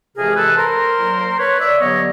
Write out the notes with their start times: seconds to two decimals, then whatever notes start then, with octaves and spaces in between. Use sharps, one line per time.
0.16 F2 C3 E3 G#3 G#4 A#4
0.36 A4 B4
0.57 A#4 C5
0.98 A#2 F#3 A#3
1.39 B4 C#5
1.60 D5 E5
1.80 G2 D3 F#3 B3 C#5 D#5